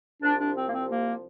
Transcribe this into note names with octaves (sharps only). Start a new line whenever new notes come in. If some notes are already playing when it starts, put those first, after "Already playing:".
C2 C3 F3 D4
D4
C4
A#3
C4
A#3